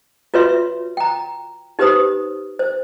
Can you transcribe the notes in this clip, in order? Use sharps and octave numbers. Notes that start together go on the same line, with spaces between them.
F4 F#4 B4 C#5 E5 C6
G5 A#5
D#4 G4 B4 C5 B5 D#6
C5